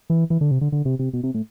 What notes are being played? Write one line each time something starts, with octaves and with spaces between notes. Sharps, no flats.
E3
E3
D3
C3
D3
D3
C3
C3
B2
C3
A2